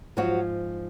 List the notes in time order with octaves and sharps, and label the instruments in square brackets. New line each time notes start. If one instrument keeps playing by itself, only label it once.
[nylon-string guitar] G#2 F3 F#3 F#4